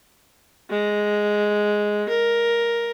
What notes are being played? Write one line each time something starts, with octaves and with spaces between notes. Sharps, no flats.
G#3
A#4